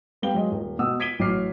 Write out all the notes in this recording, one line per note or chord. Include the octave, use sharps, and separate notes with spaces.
G3 B3 F5 G5 G7
F#3 G#3 D#5
D#1
B2 F#5 D#6 E6
G#6 B6 D7 D#7 G7
A1 F#3 D6 F6 C7